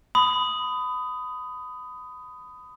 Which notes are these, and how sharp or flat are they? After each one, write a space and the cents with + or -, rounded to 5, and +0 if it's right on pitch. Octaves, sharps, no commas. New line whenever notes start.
B5 +25 D#6 +0